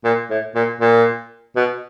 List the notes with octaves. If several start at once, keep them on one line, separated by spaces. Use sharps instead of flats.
A#2
A2
A#2
A#2
B2